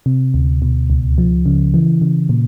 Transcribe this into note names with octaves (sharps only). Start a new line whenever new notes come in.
C3
D2
B2
C#2
F3
C#3
E3
C#3
A#2